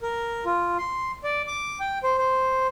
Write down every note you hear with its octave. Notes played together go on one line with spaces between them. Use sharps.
A#4
F4
C6
D5
D6
G5
C5
C5